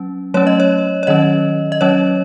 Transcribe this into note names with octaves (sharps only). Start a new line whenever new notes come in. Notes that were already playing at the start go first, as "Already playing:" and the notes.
Already playing: F#3 C#4
F#3 A3 C#4 C#5
D#5
C#5
C#5
D#3 F#3 C#4 D#5
D#5
F#3 C#4 C#5